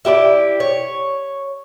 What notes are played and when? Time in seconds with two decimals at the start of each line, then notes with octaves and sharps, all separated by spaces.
0.05 E4 G4 B4 D5
0.60 C#5